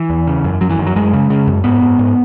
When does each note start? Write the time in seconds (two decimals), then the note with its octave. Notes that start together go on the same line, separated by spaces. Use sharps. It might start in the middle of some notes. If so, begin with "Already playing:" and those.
Already playing: E3
0.10 E2
0.27 C#3
0.45 F#2
0.61 F#2 F#3
0.70 E3
0.79 F#2 D#3
0.86 F#3
0.96 F#2 G#3
1.13 C#3
1.30 C#3
1.47 F#2
1.64 G#2 B3
1.82 G#2
1.99 G#2